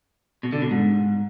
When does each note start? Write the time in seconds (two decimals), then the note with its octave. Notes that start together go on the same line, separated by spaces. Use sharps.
0.43 B2
0.53 D3
0.62 B2
0.71 G#2